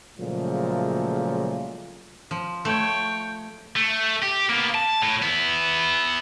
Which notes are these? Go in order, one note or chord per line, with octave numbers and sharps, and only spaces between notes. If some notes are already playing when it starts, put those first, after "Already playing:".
A#2 C#3 F3 F#3 G#3 A3
F3
A3 C#5 G5
A3
G4
A#3 B3
A5
A2
B3 E4